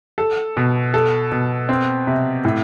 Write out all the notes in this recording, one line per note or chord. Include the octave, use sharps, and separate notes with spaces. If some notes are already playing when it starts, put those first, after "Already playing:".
A4
B2
A4
B2
C4
C3
A2